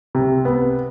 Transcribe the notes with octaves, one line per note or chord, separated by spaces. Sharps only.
C3
B3